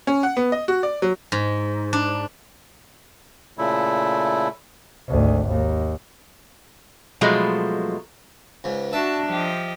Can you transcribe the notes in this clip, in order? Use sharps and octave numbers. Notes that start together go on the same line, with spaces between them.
C#4
F#5
B3
D#5
F#4
D5
F#3
G#2
D4
A#2 C#3 A3 E4
G#1 D2
D#2
B2 F3 F#3 G#3 A3
C#2 G#2
D4 F#4 E5 A5
F3 G4 D#5